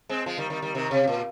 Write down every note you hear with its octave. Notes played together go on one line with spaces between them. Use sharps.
G#3 C4
F3 G#3
D#3 G3
D#3 G3
D#3 G3
C3 D#3
C3
A#2